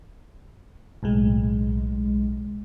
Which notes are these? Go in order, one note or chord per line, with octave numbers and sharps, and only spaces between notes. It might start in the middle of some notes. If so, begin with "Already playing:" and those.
B1 A2 G#3